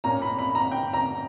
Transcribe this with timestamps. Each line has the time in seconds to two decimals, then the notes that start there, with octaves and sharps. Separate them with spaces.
0.04 A#2 A#3 C#4 A#5
0.22 B5
0.39 B5
0.55 A#5
0.71 G5
0.93 A#5